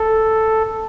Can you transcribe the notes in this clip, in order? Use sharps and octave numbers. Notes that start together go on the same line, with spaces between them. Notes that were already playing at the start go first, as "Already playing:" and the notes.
Already playing: A4